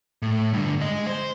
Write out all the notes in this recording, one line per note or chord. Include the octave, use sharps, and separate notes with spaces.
A2
G2 D3
G#3 D#5
C5